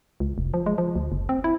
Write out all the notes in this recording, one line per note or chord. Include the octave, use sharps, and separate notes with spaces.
C#2
F1
F3
G#3
F3
D2
F#1
C4
E4